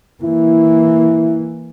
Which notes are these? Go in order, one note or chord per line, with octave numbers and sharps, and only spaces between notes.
E3 A#3 E4